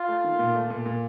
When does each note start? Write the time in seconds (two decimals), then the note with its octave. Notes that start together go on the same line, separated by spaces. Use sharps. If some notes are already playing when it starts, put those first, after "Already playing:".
Already playing: F4
0.08 A3
0.24 D#3
0.39 A#2
0.55 A3
0.70 A#2
0.86 A#2